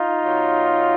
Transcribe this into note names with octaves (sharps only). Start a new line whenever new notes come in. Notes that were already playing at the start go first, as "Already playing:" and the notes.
Already playing: D#4 F4
B2 F#3